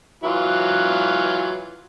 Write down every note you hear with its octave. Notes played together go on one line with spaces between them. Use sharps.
E3 F#3 F4